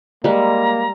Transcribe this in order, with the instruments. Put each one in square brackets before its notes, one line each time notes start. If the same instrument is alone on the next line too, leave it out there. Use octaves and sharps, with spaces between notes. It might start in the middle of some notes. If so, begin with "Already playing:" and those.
[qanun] G3 G#3 [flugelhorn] A#3 [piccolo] A#5